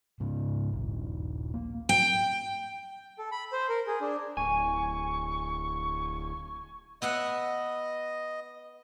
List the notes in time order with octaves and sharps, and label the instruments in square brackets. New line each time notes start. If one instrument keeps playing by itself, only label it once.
[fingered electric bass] G#2 C#3
D#1 A#1
A#3
[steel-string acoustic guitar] G5
[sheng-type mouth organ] A4
B5
C5
A#4
G#4
D4
[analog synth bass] D1 [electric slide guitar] G#5 [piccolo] C#6
[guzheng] B3 E5 F#5 [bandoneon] D#5